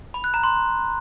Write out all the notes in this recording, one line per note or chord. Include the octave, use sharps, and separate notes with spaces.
B5
F#6
A#5
C6